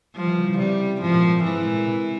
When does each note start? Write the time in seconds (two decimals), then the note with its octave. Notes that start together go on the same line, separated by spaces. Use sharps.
0.16 F3 G3
0.27 E3
0.37 C#3
0.48 C#3
0.58 C3 G3
1.01 G#2 F3
1.12 A#2
1.24 G#2
1.44 G#2 E3
1.65 A#2
1.86 C3